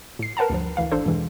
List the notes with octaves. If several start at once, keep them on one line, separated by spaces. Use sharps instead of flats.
A2 C7
A#4 B4 F#5 A5 A#5
D2 G2 F3
D2 E3 F5
A1 D4 A4 C5
E2 G2 B2 E3 G#3